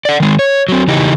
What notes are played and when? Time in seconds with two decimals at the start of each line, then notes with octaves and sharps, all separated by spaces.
0.05 D5 F#5
0.20 D#3 G#3
0.39 C#5
0.69 F#3 C4
0.87 C#3 E3 D#4 G4